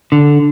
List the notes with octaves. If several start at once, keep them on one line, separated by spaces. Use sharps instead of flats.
D3